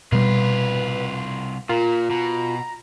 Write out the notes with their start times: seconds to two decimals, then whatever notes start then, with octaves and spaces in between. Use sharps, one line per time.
0.12 C2 B2 G3 F4 B4
1.69 A#2 F4 A#4
2.10 B2 A#5